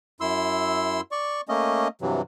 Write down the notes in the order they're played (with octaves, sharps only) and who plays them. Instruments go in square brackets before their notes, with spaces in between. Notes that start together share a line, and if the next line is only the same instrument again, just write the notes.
[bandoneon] F#2 E4 C6 E6
D5 C#6
A3 A#3 C#4 D#5
G2 C3 E3 F#3